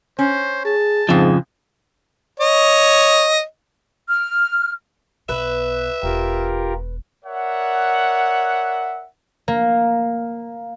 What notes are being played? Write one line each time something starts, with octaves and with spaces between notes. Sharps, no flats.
C#4 C5
G#4 A5
F2 G#2 C#3 F3 G#3
C#5 D#5
F6
B1 B3 B4 E5
E1 F4 G4 A#4
A#4 C#5 D5 E5 F#5
A#3